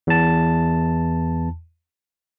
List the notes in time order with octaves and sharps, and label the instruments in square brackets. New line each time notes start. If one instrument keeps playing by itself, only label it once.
[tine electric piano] E2 A5